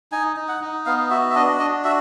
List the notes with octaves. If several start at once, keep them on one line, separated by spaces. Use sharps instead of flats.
D#4 G#5
D#4
F#5
D#4
B3 F5
F#4 E5
E5
D4 D#5
D4 D#5
F#4 E5